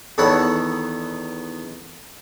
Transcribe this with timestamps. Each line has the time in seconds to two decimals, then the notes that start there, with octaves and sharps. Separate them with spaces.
0.18 E2 D#3 A4 C#5 F#5 B5